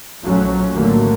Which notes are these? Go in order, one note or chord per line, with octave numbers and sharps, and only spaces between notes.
A#1 F3 F#3 A3 C#4
A2 D3 D#3 F#3 A3 A#3